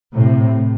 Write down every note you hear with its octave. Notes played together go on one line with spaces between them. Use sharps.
A2 C3